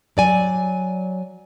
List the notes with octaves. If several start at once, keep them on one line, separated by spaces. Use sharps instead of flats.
F#3 D5 G#5